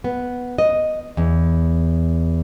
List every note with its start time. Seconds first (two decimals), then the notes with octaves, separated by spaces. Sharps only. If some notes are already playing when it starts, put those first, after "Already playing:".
0.04 B3
0.58 D#5
1.17 E2